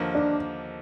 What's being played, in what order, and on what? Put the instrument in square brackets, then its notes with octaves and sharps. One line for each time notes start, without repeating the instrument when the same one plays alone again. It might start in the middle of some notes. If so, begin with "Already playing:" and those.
Already playing: [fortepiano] D#2 D3 F3 A#3
[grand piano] D4